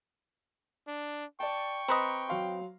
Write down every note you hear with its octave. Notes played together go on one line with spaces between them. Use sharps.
D4
D5 G5 A5 C#6
C4 B4 D#5 A#5
F#3 F5 C6